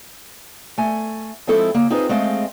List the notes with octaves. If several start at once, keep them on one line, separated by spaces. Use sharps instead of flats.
A3 G#5
F3 G#3 C4 E4 A4 C5
C#3 A#3
C4 D#4 F4 G#4 B4 C5
G#3 A3 C4 G#4 D#5 F5